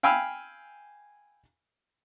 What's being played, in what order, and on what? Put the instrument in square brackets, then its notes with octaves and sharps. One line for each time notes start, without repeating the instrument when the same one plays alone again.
[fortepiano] F5 G5 G#5 B5 E6 F6